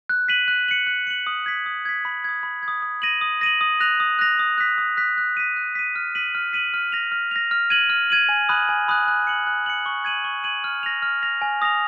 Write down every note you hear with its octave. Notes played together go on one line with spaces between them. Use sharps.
F#6
B6 D#7 F#7
F#6
C#7 F#7
F#6
C#7 F#7
D#6
G#6 B6
D#6
G#6 B6
B5
D#6 G#6
B5
G#6
D#6
D#6
A#6 D#7 F#7
D#6
A#6 D#7 F#7
D#6
F#6 A#6 F7
D#6
F#6 A#6 F7
D#6
F#6 B6
D#6
F#6 B6
F#6
B6 D#7
F#6
B6 D#7
F6
B6 D#7 F#7
F6
B6 D#7 F#7
F6
A#6 F7
F6
A#6 F7
F6
G#6 D#7 F#7
F6
G#6 D#7 F#7
G#5
B5 D#6 F#6
G#5
B5 D#6 F#6
F#6
C#7 F#7
F#6
C#7 F#7
C#6
G#6 D#7 F#7
C#6
G#6 D#7 F#7
F6
A#6 F7
F6
A#6 F7
G#5
D#6 A#6 F7